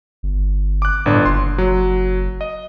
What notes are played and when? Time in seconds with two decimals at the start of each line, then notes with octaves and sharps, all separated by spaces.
0.23 G1
0.82 D6 F#6
1.06 G1 A2 D4
1.26 F#1 C6
1.58 F#3
2.41 D#5